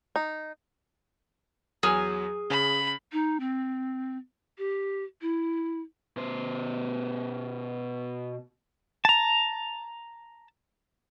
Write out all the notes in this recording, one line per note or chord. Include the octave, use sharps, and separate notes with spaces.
D#4
E2 F#3 G#4 G#5 F6
C#3 B5
D#4
C4
G4
E4
B2 C5
A5 A#5